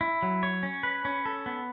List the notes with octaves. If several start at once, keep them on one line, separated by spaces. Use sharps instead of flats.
E4
F#3
C#5
C#4
B4
C#4
A4
B3